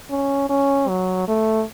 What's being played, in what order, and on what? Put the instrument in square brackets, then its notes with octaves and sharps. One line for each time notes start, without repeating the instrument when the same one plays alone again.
[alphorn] C#4
C#4
F#3
A3